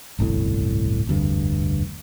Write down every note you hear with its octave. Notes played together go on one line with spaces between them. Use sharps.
D1 G1 C2 A2
F1 D2 G2